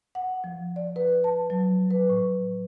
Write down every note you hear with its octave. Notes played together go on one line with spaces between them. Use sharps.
F#5
F3
D5
B4
A5
F#3
B4
A2